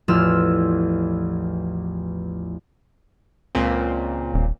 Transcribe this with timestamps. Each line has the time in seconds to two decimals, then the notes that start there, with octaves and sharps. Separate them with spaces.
0.08 A1 E2 F3 E6 F6
3.55 C#2 A#2 C4
4.34 D#1